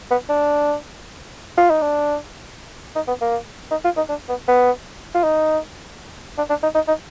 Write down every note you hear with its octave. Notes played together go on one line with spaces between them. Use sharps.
B3
D4
F4
D#4
D4
D#4
B3
A#3
D#4
F4
D#4
D4
B3
B3
F4
D#4
D4
D4
D#4
D#4
D#4